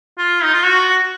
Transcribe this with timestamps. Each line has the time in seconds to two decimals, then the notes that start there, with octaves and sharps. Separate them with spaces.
0.18 F4
0.42 D#4
0.53 F4
0.64 F#4